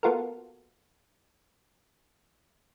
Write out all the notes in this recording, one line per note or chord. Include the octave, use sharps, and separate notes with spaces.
A#3 B3 F4 F#4 A4 A#4